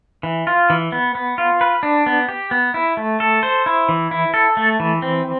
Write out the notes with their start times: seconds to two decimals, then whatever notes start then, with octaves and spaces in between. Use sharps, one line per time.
0.23 E3
0.47 F4
0.70 E3
0.92 B3
1.15 B3
1.38 F4
1.61 B4
1.83 D4
2.06 B3
2.29 G4
2.51 B3
2.74 E4
2.97 A3
3.20 A4
3.43 C5
3.66 E4
3.89 E3
4.11 E4
4.34 A4
4.57 A3
4.80 E3
5.02 C4